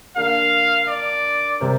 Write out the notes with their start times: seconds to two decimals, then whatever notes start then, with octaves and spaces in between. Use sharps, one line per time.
0.16 D3 A#3 D4 A#4 F5
0.88 D5
1.60 C3 G3 C4 A#4